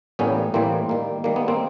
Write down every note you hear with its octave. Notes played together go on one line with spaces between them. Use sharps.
A2 E3 G3 A#3 B3 C#4
A2 E3 G3 A#3 C4
D#3 G3 A#3
D#3 G3 A#3
B3
A#3 C4